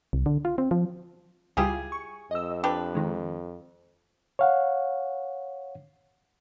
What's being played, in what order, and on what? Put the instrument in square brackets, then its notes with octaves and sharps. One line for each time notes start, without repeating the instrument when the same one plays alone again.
[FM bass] C2
D3
F4
C4
F3
[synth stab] C#2 G3 F4 [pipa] E4 G4 G#4
[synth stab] C#6
[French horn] F2 [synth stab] D#5 E6
[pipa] D4 G4 B4
[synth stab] D#3 G#3
[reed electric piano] C#5 F5 F#5